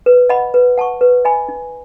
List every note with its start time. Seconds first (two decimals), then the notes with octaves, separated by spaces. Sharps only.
0.06 B4
0.29 D#5 F#5 B5
0.54 B4
0.77 F#5 A5 C#6
1.01 B4
1.25 D#5 G#5 B5
1.49 D#4